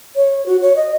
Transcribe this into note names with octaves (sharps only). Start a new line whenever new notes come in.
C#5
F#4
C#5
D#5